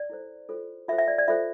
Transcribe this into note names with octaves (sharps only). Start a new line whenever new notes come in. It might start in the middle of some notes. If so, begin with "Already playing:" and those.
Already playing: D5
E4 A4 C5
F4 A4 C5
F4 A4 C5 E5
E5
D5
D5
F4 A4 C5 E5